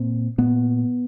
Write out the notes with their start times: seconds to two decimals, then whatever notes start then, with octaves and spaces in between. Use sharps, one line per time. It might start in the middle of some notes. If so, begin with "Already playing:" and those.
Already playing: A#2 C4
0.38 A#2 B3